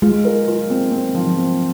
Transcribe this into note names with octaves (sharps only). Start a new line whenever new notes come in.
G#3 F4
A#4
F4
C4
C4
F3
C4